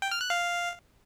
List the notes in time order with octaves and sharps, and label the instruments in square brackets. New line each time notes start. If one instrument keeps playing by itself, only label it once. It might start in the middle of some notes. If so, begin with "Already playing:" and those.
[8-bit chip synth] G5
F6
F#6
F5